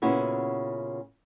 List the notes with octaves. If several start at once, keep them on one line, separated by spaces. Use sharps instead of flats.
A#2 C#3 B3 C#4 E4 F#4